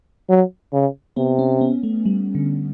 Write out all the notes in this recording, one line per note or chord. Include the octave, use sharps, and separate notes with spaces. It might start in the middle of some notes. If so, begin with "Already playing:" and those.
F#3
C#3
C3 B3
C#4
B3
A3
G3
D3